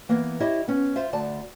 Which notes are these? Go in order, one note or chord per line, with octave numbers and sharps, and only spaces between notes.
E3 A#3 B3 A#4
E4 G4 C#5 D#5 E5
B3 C#4
F4 C5 E5 F5
D2 D5 A5